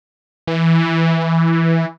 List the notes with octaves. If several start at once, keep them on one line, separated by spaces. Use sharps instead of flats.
E3